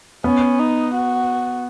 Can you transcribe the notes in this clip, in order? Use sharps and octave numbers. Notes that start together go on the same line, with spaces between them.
B3 C#4
D#4
F#4